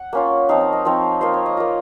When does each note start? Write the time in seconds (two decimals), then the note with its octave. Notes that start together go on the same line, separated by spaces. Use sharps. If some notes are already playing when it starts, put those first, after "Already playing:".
Already playing: F#5
0.13 A#3 C#4 F4
0.49 F3 C4 D#4 F5
0.61 D#5
0.73 D#5
0.85 F3 C4 D#4 C#5
1.21 A#3 F4 C5
1.34 C#5
1.46 D#5
1.57 A#3 F4 D#5